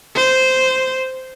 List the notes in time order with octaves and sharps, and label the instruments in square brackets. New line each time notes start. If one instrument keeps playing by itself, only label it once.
[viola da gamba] C5